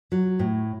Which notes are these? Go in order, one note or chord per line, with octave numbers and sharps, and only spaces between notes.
F#3
A2